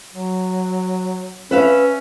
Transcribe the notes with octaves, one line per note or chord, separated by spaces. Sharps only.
F#3
C#4 B4 E5 F5